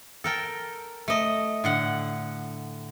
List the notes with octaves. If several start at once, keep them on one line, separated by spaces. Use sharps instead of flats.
A4 A#4 G5
A3 D#5
A2 D3 F#5